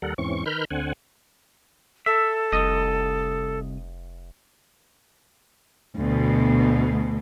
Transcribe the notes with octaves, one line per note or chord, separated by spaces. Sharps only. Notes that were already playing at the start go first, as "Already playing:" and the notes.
D#2 G3 A4 A#4 F#5
E2 G#2 E3 C4 C#4 C#6
D#3 A#4 B4 B5 F6 G6
D2 D3 C4 F#5 G#5
A4 E5
F1 C2 D#5
D2 B2